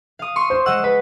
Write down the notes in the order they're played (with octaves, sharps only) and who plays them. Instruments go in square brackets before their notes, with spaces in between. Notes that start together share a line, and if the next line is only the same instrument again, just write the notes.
[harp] F5 D#6
[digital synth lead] C6 [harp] C#6 D#6
[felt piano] C5
[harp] G#3 D#5 F#5 [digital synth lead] E6
[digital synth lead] B4